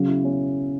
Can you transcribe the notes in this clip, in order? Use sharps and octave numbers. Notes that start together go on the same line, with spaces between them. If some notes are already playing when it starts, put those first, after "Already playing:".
Already playing: C#3 F#3
E4
C#4